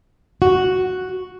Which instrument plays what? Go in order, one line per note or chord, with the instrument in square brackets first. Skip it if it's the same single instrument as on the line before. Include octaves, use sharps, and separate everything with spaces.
[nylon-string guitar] F#4